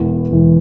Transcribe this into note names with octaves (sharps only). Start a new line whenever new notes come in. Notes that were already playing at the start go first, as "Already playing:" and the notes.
Already playing: E1 E2 E3 B3
E1 E2 E3 B3